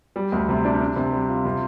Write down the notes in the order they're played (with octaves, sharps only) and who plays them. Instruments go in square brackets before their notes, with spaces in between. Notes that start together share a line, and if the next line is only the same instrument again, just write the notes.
[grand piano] G3
D2
C3
D4
D4
C3
G3
F4
C3